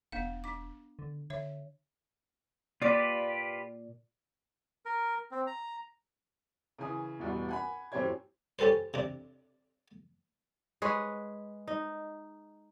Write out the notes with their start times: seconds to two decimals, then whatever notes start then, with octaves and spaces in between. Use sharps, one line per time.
0.12 E1 B3 D4 F5
0.44 D4 D6
0.99 D3
1.30 D3 C#5 E5
2.82 A#2 F4 G4 B4 D5
4.86 A#4
5.31 C4
5.47 A#5
6.78 C#3 E3 G#5 D#6
7.20 A1 E2 B2 G3
7.48 F#5 G#5 B5
7.92 F#2 A2 C4 G4 C#5 G#6
8.59 C#4 G4 A4 B4 C5
8.94 C3 D4
10.82 G#3 G#4 B4 C#5
11.68 D#4